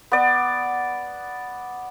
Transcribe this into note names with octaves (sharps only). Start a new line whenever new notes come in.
B3 D5